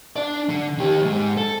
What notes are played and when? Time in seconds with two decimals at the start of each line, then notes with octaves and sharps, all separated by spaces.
0.16 D4 D5
0.49 D3
0.78 D#3 G4
1.01 E2 G#2
1.37 A4